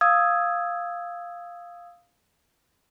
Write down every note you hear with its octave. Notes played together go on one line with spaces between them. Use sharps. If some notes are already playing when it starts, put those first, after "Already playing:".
F5 D#6 E6 G#6